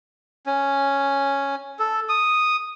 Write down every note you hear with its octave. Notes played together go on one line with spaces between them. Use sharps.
C#4
A4
D#6